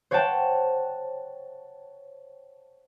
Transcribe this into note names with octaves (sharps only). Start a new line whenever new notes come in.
C5 C#5 F#5 G5 A5